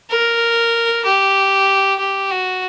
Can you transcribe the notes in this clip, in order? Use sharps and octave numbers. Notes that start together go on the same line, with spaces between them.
A#4
G4
G4
F#4